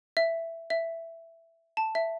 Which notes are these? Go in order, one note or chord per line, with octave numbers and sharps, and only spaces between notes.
E5
E5
A5
E5